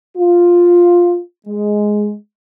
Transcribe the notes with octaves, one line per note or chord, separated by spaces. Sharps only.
F4
G#3